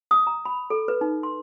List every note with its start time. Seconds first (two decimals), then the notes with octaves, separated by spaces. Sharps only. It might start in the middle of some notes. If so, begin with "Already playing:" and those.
0.11 D#6
0.27 A#5
0.45 B5
0.70 A4
0.88 B4
1.01 D#4
1.23 C6